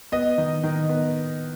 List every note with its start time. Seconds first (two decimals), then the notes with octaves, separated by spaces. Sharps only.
0.12 B3 D#5
0.38 D#3
0.63 D#3
0.89 B3